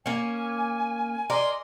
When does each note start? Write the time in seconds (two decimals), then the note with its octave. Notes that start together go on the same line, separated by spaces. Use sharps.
0.06 A#3 C#4 G#5
1.30 A#4 D5 D#5 G#5 C6